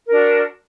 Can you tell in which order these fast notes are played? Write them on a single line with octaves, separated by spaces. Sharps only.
A#4 D4 F#4